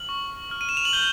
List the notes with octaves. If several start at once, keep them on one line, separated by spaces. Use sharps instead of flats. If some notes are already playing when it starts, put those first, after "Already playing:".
Already playing: F6 F#7
C#6
F6
D#7
E7
F7
F#7
G6 G7